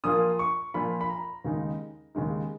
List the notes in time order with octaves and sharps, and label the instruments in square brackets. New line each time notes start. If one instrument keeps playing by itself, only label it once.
[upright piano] A#2 F3 A#3 F4 D#6
C#6
A#2 F3 A#3 F4 B5
B5
A#5
D#2 C#3 G#3 D#4
D#2 C#3 G#3 D#4